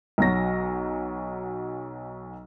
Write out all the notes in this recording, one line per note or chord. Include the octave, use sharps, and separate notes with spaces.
B1 F#3 A#6